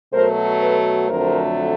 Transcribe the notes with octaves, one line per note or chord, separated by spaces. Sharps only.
B2 F#3 A3 A#4 C5
A4 B4
F2 D3 F#3 A3 A#4 C5